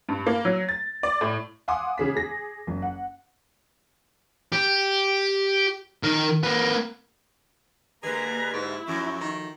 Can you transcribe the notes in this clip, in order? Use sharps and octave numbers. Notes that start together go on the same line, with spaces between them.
G2
A#3
F#3
A6
D5
A2
F5 F#5 G#5 C6 D6 D#6
C#3 G#4 B6
G#4 A#6
F#1
F#5
G4
D#3 A#4
A#3 B4
D3 G3 G#3 A#3 G#4 B4 A#5
G#2 E4
F#2 F3 A3 F#4 C#6
D#3